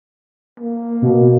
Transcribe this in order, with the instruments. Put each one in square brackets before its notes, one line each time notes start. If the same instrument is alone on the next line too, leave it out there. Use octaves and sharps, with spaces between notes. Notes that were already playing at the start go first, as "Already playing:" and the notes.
[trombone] A#3
[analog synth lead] B2